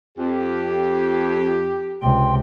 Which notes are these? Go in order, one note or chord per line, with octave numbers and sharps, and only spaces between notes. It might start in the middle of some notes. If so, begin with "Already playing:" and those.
F2 G4
C#2 C3 G5 C6